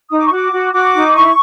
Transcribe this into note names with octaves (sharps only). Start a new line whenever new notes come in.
D#4 D#6
D6
C#6
F#4 D6
F#4
F#4 D6
D#4
E4 C#6